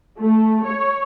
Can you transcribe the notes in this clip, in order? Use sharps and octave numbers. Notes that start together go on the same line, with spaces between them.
A3
C#5